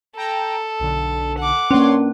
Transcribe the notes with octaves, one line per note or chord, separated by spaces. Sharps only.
A4 G5 A#5
B1 D3
F#5 D6
A#3 C#4 D4 C#5 C6